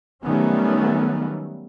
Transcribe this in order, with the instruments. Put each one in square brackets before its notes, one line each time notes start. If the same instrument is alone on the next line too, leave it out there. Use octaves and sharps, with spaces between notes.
[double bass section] D#3 F#3 G3 A3 B3 C#4